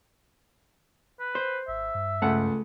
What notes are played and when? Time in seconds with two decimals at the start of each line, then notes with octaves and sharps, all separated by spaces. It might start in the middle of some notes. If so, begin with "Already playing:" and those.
1.20 B4
1.35 C5
1.68 G#1 E5
1.95 G2
2.22 C#2 A3 F#5 A5